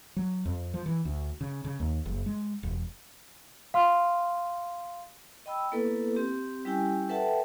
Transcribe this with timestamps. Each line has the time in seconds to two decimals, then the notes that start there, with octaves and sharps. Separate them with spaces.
0.16 F#3
0.45 F2
0.74 F3
0.86 E3
1.05 D2
1.41 C#3
1.65 C#3
1.80 D#2
2.06 F#1
2.26 G#3
2.63 E1
3.74 F5 C6 F6
5.46 D#5 G5 B5 E6
5.72 A#3 B3 E4 A4 B4
6.16 C4 G4
6.65 G3 C#4 E4 G4 G5 G#5
7.09 A4 B4 E5 F#5 G5 A5